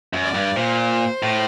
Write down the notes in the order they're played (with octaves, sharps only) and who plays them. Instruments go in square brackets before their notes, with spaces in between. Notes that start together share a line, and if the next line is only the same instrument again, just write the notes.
[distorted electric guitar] F#2
[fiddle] D5
[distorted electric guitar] G2
[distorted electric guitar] A#2 [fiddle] C5
[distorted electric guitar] A2